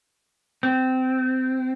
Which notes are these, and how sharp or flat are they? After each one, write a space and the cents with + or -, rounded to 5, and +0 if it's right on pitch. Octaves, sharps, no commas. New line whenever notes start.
C4 -20